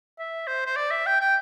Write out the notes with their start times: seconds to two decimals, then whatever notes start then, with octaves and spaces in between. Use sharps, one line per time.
0.18 E5
0.47 C5
0.66 C5
0.76 D5
0.91 E5
1.06 G5
1.21 G5